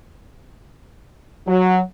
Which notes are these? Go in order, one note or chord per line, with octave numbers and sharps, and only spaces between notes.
F#3